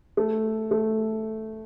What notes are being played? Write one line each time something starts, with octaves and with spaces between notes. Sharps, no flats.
A3
A3